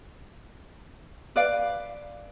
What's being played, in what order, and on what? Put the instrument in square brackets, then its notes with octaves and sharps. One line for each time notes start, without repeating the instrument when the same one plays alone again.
[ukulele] B4 D5 F5